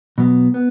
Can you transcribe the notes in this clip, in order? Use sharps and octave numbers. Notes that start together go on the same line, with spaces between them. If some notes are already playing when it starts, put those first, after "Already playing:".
B2 F#3 B3
B3